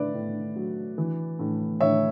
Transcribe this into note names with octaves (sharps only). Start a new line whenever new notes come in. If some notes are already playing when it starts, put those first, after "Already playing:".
Already playing: A2 B4 D5 E5
A2
F#3
E3
A2
A2 C#5 E5